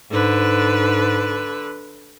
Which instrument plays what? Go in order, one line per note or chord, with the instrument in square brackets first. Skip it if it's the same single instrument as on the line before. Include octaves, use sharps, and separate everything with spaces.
[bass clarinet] G#2 [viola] D3 B4